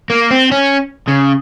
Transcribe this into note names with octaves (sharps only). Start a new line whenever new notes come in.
A#3
C4
C#4
C#3